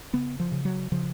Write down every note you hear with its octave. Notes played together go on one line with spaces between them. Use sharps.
C#3 B3
F3
C#3
F#3
C#3 F3